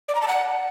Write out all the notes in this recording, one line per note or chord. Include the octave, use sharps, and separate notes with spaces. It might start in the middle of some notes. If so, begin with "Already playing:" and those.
D5
A#5
A5
F#5